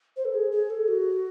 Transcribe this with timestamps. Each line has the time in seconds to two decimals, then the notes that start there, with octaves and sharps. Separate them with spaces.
0.17 C5
0.25 A4
0.34 G#4
0.52 G#4
0.70 A4
0.88 F#4